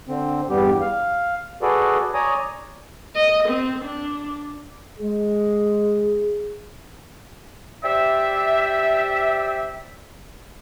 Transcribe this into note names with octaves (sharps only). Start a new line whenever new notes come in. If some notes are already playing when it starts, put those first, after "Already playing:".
D3 C4
E2 G2 G3 B3 G4
F5
F#4 G#4 A4 B4 D5
C#5 D5 G#5 A#5 D#6
D#5
C4
D4
G#3 G#4
G4 C5 D5 E5